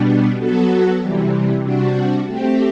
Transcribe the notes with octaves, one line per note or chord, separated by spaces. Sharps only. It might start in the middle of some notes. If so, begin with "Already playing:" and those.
Already playing: B2 G3 B3 D4
F#3 B3 F#4 A4
C3 E3 G3
C3 G3 D4 F#4
A3 C4 G4